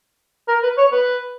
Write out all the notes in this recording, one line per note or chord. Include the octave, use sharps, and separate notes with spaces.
A#4
B4
C#5
B4